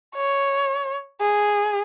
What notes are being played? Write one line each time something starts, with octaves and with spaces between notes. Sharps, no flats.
C#5
G#4